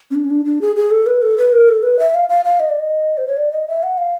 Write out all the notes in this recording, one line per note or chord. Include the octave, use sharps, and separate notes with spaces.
C#4
D4
C#4
D4
D4
G#4
G#4
A4
B4
A4
B4
A#4
A4
B4
E5
F5
F5
F5
D#5
D5
D#5
C5
C#5
D5
D#5
E5
F#5
F5